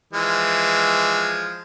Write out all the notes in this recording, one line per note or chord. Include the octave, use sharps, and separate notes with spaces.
E3 F3 G#3